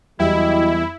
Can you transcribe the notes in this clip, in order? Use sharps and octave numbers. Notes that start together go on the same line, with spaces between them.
E2 F#3 G3 E4 G4 D#5 G5